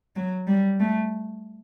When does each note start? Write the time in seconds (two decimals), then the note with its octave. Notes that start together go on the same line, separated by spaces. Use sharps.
0.16 F#3
0.47 G3
0.80 A3